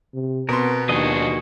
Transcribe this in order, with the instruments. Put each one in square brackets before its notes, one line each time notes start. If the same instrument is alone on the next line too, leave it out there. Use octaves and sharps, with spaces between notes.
[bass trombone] C3
[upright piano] B2 C6 [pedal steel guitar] B3 A#4 [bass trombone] C4
[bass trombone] D#2 [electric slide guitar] D#3 F3 D4 [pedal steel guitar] F#4 G#4 D#5